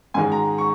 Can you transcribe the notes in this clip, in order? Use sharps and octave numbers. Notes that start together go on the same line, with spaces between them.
G#2 D#3 G#3 G#5
A#5
C#6